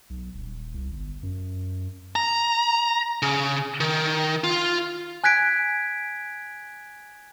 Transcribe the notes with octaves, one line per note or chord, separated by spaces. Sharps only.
B1
D#1
C2
G1
F#2
A#5
C#3
D#3
F4
G#5 F#6 G#6 B6 D7